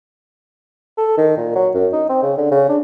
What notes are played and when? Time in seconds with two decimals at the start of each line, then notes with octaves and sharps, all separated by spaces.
0.98 A4
1.18 D#3
1.37 A#2
1.55 F#3
1.74 F#2
1.93 D#4
2.09 C4
2.22 C#3
2.37 D3
2.51 C#3
2.69 D4